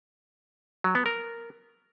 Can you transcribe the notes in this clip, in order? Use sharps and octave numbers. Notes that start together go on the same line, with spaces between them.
F#3
B3
A#4